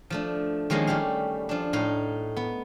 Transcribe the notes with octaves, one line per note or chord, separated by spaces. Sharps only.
F3 A3 D4
D#3 F3 G#3 A#3 C#4
G3 A3 G4 F5
F3 D4
A2 A3 D#4 F5
B3